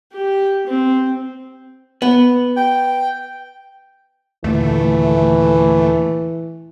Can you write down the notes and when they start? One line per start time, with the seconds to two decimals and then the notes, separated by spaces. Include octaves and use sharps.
0.13 G4
0.67 C4
2.02 B3
2.57 G5
4.44 D#2 A#2 D3 E3 A3